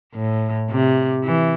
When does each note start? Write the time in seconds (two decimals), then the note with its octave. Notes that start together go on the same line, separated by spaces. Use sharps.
0.14 A2
0.70 C3
1.25 E3